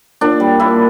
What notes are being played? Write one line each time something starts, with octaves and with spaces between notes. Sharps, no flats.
A#2 D4
G3
A#2 E4